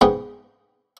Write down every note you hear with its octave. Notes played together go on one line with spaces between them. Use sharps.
G#2 B3 D#4 G#4 G5